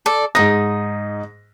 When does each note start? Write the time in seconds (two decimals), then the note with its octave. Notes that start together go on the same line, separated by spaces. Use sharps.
0.06 A4 D5
0.35 G#2 D#4 D#6 A#6